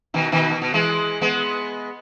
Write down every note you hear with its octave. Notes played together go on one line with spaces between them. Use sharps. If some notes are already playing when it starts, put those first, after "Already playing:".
B2 D#3
B2 D#3
B2
B2
E3 G#3
G#3 B3